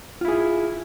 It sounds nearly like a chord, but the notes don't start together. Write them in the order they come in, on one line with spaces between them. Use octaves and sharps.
F4 E4 G#4